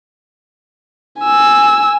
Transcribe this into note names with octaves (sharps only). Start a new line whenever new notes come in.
G#5 E6